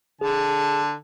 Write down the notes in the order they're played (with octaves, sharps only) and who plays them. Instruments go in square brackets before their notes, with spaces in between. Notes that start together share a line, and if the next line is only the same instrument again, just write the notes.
[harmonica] D3 A5 [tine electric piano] G#4